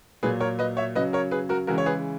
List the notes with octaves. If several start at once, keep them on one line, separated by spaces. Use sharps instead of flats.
A#2 F#3 G#4 B4
A#4 C#5
B4 D#5
C#5 E5
C#3 F#3 B4 D#5
A#4 C#5
G#4 B4
F#4 A#4
C#3 E3 G#3 F#4 A#4
C#5
G#4 B4